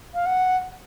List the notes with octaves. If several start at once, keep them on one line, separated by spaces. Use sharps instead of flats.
F5
F#5